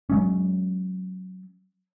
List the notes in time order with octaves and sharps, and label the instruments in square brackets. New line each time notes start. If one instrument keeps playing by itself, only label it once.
[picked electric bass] F#3 G#3 C#4